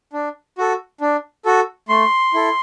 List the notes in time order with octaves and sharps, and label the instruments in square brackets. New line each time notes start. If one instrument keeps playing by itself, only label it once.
[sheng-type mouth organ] D4
F#4 A4
D4
F#4 A4
A3 C6
E4 A4